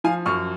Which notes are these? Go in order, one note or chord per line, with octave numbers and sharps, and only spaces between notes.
F3 F5 G#5
F#2 C#6 F6